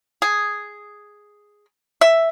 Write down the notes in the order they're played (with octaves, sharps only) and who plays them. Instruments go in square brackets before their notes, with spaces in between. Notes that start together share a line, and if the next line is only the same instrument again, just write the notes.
[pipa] G#4
E5